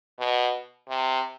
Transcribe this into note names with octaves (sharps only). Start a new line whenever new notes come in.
B2
C3